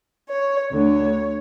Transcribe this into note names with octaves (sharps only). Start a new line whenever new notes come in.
C#5
D2 D3 C#5